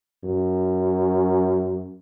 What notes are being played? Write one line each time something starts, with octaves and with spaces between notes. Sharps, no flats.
F#2